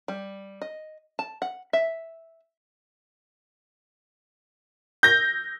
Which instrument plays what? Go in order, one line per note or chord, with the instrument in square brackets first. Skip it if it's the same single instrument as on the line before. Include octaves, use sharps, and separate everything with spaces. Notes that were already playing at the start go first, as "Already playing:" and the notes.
[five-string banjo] G3
D#5
A5
F#5
E5
[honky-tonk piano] G6 A#6